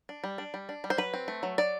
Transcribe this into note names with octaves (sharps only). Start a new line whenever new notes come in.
D4
G3
D4
G3
D4
G3
C5
F#3 B4
C4
A3
F#3
F#3 D5